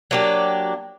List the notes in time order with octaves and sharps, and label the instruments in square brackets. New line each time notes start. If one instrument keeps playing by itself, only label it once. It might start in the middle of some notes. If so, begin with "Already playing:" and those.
[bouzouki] F#3 A#3 D4 G4